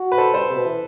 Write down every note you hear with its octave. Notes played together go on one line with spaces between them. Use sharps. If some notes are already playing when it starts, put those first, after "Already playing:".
Already playing: F#4
B4
A4 C5
G3 A4 C5
C3
B2
E3